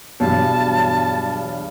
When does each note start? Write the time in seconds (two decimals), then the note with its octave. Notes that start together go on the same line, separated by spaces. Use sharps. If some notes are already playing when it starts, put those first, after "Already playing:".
0.20 E2 G2 B2 F#3 A5